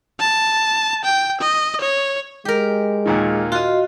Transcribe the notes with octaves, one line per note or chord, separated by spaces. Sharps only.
A5
G5
D#5
C#5
G#3 G4 A#4
D#2 A#2 D#3
F4 F#4 D#5